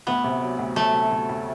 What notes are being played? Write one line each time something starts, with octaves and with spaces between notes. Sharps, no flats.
D2 B3
C3
F#3
D2
F#3 A3
C3
D2
D2